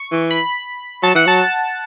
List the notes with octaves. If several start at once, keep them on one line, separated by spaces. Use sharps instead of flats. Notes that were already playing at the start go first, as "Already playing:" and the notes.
Already playing: C#6
E3
B5
F#3 A5
E3 F#5
F#3 A5